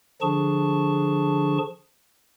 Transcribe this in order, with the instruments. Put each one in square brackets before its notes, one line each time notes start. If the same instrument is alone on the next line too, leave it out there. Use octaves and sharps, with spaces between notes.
[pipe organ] D3 F3 D4 G#4 A5 C#6